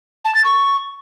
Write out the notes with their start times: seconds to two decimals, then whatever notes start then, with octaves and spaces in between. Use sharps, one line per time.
0.24 A5
0.34 A6
0.44 C#6